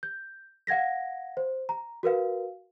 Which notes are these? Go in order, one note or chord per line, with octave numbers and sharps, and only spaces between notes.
G6
F5 F#5 G#6 A#6 B6
C5
A#5
F#4 A#4 B4 F5